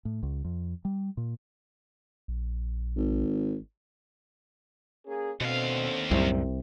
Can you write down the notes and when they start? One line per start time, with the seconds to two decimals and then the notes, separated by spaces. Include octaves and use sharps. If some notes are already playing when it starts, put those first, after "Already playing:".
0.05 A2
0.23 C#2
0.44 F2
0.85 G3
1.17 A#2
2.28 A#1
2.96 G#1
5.06 A#3 C#4 G#4
5.41 D#2 B2 D3 A3 C4 F5
6.11 C2 F#2 A2 C3 G3